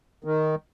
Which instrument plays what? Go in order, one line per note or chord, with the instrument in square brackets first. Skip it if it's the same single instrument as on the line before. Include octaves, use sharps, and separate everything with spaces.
[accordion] D#3